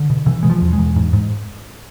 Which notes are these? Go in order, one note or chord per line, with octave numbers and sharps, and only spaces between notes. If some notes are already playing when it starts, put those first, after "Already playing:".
Already playing: D3
B2
B2 E3
B2 G#3
F3
E2
G#3
E2
G#2
G#2